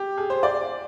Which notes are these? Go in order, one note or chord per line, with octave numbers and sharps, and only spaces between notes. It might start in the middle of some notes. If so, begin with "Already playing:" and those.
Already playing: G4
G#4
C5
D5